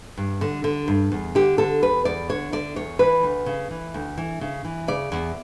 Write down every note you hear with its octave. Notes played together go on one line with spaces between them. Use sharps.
G2
D3
D3
G2
E2
D3 G4
D3 A4
E2 B4
E2 D5
D3 C#5
D3 D5
E2 C#5
E3 B4
D2
C#3
E3
D2
E3
C#3
E3
C#3 D5
E2